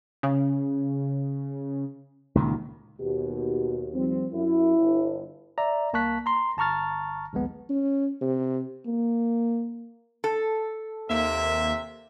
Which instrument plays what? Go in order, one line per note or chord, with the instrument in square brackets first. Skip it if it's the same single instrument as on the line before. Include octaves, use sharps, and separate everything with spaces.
[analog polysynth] C#3
[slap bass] C#2 A#2 D#3
[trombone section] D#2 [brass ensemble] B2 F#4 G4
[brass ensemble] F3 G3 C4
[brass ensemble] F#2 [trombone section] E4
[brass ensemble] G1
[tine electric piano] D5 E5 A#5
C2 A#3 A5 C#6 F#6 B6
A#5 C6
G1 A5 A#5 C#6 F6 A6
A#1 D#2 G#3 B3
[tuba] C#4
C3
[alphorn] A#3
[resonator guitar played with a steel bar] A4
[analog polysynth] D#2 A#3 [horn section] C3 E5